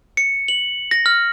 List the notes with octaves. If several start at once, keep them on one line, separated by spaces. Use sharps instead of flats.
C#7
F#7
A#6
F6